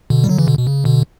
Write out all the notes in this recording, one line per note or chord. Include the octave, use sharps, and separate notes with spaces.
B2 D3
G3
D3 F#3
C#3 E3
B2 D3
B2
C#3
B2 D3